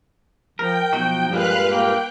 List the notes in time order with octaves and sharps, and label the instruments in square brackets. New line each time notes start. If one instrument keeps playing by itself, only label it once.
[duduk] F3 [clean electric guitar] A#4 [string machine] G5
[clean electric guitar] B1 D#4 F#4 [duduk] F3
[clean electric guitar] G2 A#2 G#3 [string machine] B4 F5 F#6
[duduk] A#3 [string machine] G5